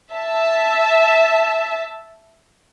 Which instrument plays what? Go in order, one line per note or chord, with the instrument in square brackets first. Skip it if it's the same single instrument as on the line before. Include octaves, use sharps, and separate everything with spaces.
[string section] E5 A5